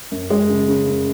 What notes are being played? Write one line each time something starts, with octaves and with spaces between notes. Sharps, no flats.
F#2
F#2 G#3
C#3
C#3
F#2